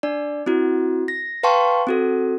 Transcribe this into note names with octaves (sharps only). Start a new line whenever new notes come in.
D4 D5
C4 E4 F#4
A#6
B4 F5 G5 A5 C6 C#6
C4 F#4 A4